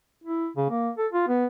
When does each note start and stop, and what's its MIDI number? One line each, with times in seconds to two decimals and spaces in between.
0.24 0.48 64
0.57 0.67 49
0.70 0.90 58
0.98 1.07 69
1.13 1.25 65
1.28 1.47 59